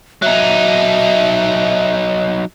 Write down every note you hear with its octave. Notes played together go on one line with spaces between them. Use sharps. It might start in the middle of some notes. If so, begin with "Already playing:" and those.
F#3 D#4 E5